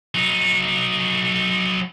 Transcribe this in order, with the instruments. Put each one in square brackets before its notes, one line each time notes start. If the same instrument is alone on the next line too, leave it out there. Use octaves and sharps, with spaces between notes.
[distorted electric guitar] F#3 D#4